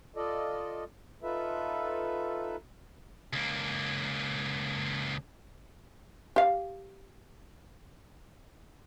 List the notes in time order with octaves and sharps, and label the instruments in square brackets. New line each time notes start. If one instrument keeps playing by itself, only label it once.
[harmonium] F4 A4 D5 D#5
D#4 F4 A4 B4 E5
[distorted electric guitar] C#2 A#3
[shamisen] G4 F5